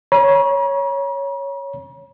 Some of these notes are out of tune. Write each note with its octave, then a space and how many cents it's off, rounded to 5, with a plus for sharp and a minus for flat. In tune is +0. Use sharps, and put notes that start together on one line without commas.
C#5 +0 A#5 +45